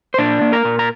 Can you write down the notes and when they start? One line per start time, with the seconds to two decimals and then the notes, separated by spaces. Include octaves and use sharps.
0.14 C5
0.18 A#2 D4 D5
0.41 A#3
0.53 A#4 A#5
0.65 A#2
0.79 A#5